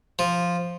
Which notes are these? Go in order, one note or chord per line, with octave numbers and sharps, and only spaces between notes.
F3